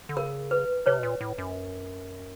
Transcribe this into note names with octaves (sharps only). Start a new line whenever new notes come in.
D3
C#3 A#4
B4
C3 B4 C#5
B2
A#2
A2
F#2